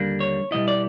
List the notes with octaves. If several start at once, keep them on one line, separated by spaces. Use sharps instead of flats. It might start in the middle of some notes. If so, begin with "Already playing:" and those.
Already playing: D#2 D3 G3 A#3 D4
C#5
B2 G3 B3 E4 D#5
D5